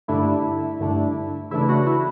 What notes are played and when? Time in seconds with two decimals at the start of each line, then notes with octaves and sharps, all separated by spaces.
0.08 G2 D3 A3 D4 E4
0.80 G2 D3 A3 D4
1.51 C#3 E3 A3 D4 E4
1.69 F#4
1.86 E4